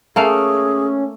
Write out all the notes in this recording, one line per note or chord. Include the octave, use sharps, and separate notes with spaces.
A3 A#3 C#4 G#4 F5